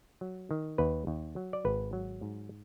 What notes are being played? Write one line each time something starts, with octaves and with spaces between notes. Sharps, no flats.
F#3
D#3
D#2 B4
D#2
F#3
D5
G#1 B4
F#3
G#2